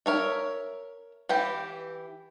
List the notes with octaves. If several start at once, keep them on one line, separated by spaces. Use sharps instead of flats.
A#4 C#5 E5
E3 G4 G5